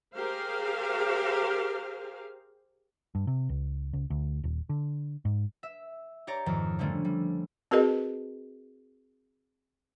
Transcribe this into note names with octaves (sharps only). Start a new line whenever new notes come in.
G4 G#4 A#4 C5 F5
G2
C3
C#2
C#2
D2
D#1
D3
G#2
E5
G4 C#5 D5 A#5
F2 G#2 D#3 F3
D3 F3 G3 A3 C#4 D4
G3
C4 F#4 G#4 A#4 B4 D#5